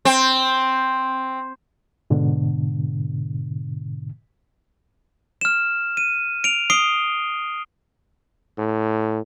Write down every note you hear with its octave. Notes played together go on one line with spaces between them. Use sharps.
C4
G#2 B2 D3
F6 E7
D#7
D7 F7
D#6 C7 D7 G7
A2